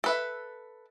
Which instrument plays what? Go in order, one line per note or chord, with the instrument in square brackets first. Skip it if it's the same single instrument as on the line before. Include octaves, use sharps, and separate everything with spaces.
[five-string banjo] A4 B4 E5